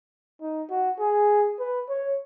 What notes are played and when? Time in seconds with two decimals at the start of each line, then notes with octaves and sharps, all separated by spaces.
0.42 D#4
0.70 F#4
1.00 G#4
1.59 B4
1.89 C#5